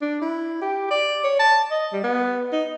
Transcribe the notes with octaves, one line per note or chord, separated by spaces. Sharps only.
D4
E4
G4
D5
C#5
A5
D#5
G3
B3
D#4